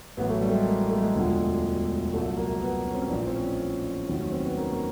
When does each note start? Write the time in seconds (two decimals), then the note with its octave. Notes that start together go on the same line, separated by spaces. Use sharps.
0.17 A1 A2 F#3 B3
0.29 A3
0.41 G3
0.49 A3
0.55 G#3
0.66 A#3
0.90 A3
1.02 G#3
1.14 E1 D2 D3 F3 G3
1.25 G#3
2.12 C2 A#2 F#3 A3
2.37 A#3
2.62 B3
2.87 C#4
2.94 C4
3.02 C#4
3.10 A#1 A2 F3 D4
3.27 C4
3.35 C#4
4.08 F1 D#2 D#3 F#3
4.20 C#4
4.32 C4
4.45 B3
4.57 A#3
4.72 A#3